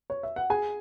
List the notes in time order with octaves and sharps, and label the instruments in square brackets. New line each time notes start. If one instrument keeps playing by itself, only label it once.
[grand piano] C#5
E5
F#5
G#4 G#5